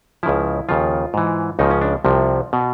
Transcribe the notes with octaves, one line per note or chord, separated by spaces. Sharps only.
C#2 C#3 F3 E4
D#2 C#3 F3 F4
G#2 E3
C#2 C#3 F3 D#4
C#4
D4
C2 C3 F3
B2